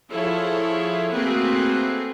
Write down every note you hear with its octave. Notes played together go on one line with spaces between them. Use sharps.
F3 E4 G#4 A4 C#5
A3 A#3 C4 F#4 G#4 B4